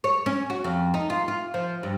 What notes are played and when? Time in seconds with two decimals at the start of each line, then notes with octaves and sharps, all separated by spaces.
0.04 C#5
0.26 C#4
0.50 F#4
0.64 F2
0.94 D#4
1.10 F4
1.28 F4
1.54 F3
1.83 G2